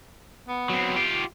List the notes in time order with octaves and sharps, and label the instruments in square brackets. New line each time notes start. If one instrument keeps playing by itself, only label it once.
[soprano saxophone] B3
[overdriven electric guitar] F#3 C4
F4 G4